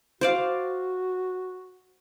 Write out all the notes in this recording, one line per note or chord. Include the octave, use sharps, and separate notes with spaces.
F#4 C5 D5 F5